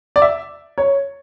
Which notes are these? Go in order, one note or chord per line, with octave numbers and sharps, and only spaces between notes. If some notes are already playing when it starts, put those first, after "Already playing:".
D5
E5
C#5